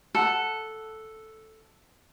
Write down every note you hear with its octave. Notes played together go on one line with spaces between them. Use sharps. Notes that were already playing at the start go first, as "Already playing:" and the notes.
A4 F#5